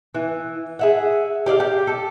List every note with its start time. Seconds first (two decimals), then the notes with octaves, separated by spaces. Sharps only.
0.15 E3
0.79 G#4 E5 F#5
1.46 G4 D5 D#5 F5
1.60 G4
1.87 A4